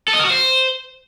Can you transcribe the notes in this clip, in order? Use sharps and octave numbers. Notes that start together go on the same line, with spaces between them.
A4
D#5
A#4
F#4
C5